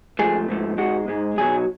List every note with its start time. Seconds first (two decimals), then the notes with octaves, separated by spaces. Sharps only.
0.19 G#2 F3 A3 G#4
0.48 G#2 F3 A3
0.78 G#2 G#3 F#4
1.08 G#2 G#3
1.38 B1 B2 F#3 G#4